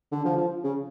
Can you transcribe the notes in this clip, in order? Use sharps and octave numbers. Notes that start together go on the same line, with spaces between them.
D3
F3
F3
C#3